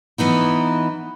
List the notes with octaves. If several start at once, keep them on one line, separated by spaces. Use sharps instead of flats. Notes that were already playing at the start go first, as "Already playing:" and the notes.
E3 B3 D#4 E4